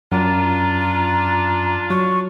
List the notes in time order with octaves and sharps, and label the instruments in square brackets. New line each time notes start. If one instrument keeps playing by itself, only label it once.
[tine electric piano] F#2 [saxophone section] D4 F4 [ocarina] A#5
[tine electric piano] F#3 [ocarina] C#6